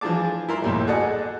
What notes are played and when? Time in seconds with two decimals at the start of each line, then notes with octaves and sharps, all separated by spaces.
0.01 E3 F3 D4 G#4 A5 D6
0.49 E4 A#4 C6
0.62 A#1 D#2 A2
0.87 F#4 G#4 A4 D5 D#5 F#5